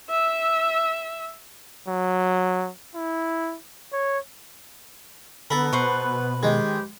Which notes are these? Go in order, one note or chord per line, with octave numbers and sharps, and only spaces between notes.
E5 E6
F#3
E4
C#5
D3 B3 A4 A#4 B5
B2 B4 C5 C#6
D#3 G#3 G4